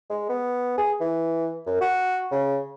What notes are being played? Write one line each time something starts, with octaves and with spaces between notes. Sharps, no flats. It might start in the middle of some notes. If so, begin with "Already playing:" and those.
G#3
B3
G#4
E3
F#2
F#4
C#3